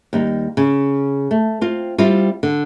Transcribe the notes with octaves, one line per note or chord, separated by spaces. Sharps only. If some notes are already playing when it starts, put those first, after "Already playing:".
D#2 G3 D#4
C#3
A3
C4 F4
G3 C4 E4 F4
D3